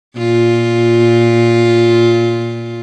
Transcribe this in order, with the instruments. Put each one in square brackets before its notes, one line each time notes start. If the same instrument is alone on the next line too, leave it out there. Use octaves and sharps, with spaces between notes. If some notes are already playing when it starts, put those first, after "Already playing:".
[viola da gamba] A#2 F4